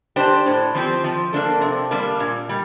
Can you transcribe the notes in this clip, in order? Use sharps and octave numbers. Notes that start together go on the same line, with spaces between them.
D4 G4 C5
A2
F3 C4 G4
F3
A#3 D4 A4
C3
G3 A#3 D4
A#2
G3